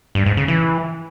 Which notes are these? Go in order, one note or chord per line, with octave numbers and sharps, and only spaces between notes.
G2
G#2
C#3
E3